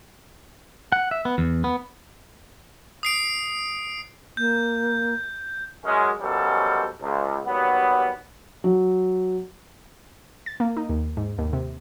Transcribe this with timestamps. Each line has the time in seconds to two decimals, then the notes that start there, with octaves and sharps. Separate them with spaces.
0.92 F#5
1.11 E5
1.25 B3
1.38 E2
1.64 B3
3.03 D#6 C7 D7
4.37 A#3 G6
5.84 F#2 G#3 C#4
6.20 F#2 B2 F3 G3 C#4 A4
7.00 C#2
7.44 D#2 F#3 G3 B3
8.64 F#3
10.46 A6
10.60 A#3
10.77 D#4
10.89 D#2
11.17 G#2
11.38 D#2
11.53 C3